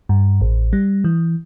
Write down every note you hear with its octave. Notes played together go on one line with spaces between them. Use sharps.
G2
A1
G3
E3